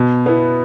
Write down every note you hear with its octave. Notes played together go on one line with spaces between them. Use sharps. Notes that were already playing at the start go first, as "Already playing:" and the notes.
Already playing: B2
B3 E4